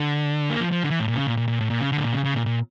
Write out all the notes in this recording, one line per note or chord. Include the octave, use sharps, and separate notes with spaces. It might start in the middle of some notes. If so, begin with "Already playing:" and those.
Already playing: D3
A#3
F3
F3
D3
E3
A2
A#2
C#3
A#2
A#2
A#2
A2
A#2
C#3
D3
A2
A#2
C#3
C#3
A#2
A#2